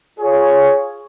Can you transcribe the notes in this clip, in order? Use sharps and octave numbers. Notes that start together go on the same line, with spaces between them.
F4 G#4 C#5